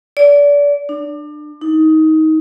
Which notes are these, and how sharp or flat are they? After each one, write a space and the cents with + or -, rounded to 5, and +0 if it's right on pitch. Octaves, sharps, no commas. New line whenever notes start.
D5 -30
D4 +30
D#4 +20